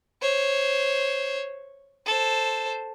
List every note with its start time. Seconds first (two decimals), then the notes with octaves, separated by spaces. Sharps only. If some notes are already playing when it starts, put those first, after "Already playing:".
0.22 C5 C#5
2.06 A4 C5